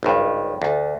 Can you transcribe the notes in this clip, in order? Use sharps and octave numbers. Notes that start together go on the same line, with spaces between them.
G#1 C#2 G2
D2